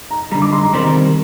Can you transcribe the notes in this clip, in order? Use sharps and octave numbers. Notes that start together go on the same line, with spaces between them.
A#5
D2 D3 G3 A#5
D6
C6
A#5
C2 C3 D#3 G3 C4